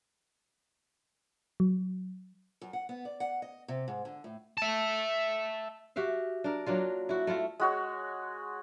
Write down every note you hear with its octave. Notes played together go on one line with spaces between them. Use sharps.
F#3
F#2
F#5
B3
D5
F#5
D#5
C3
G#2
D3
A2
E5 A5
F#4 G4 E5 F5
D4 A#4
F#3 A#3 D4 F4
E4 F#4
A3 E4 F4 E5
G#3 F#4 C#5